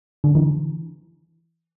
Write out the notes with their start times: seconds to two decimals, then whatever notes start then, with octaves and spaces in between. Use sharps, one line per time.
0.24 D3
0.35 E3